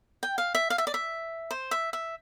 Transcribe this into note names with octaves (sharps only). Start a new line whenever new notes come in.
G5
F5
E5
F5
E5
D5
E5
C5
E5
E5